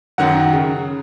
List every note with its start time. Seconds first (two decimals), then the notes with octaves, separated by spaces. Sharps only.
0.18 F#2 D#3 F#3 F#5
0.53 C#3